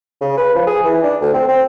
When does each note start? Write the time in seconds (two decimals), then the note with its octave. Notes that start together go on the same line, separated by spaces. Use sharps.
0.21 C#3
0.37 B4
0.55 F3
0.67 G#4
0.84 E3
1.03 D4
1.21 D2
1.33 C4
1.48 C4